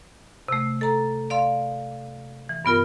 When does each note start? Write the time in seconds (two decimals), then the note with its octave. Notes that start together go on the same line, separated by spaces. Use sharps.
0.48 C3 A3
0.81 A4 A#5
1.30 D5 F5 C6
2.49 E3
2.65 G2 B3 F4 A#4